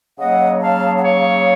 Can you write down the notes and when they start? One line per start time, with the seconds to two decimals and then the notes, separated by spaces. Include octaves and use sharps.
0.19 C#3 F#3 A#3 D#5 F#5
0.62 F5 A5
0.99 F#5
1.04 C#5 F5